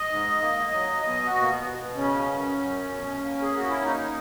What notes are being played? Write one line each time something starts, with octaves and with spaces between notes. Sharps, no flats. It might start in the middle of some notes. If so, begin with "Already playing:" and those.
Already playing: D#5
G#2
A#3
F#3
B2 D#5
F#4
B2
A#3
B3
B2
C#3 C#4
F#2
F#2
B2
A#3
G#4
A#3 F#4
E4
A#3 D#4